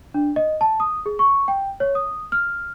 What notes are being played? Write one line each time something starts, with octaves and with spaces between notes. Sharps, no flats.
D4
D#5
A5
D#6
G#4
C#6
G5
C#5
D#6
F6